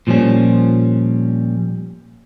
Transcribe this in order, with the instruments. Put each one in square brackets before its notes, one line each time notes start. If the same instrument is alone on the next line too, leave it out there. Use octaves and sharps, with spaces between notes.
[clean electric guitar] A#2 F3 G3 C#4